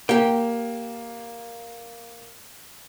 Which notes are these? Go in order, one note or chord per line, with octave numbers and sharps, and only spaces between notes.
A#3 G4 G5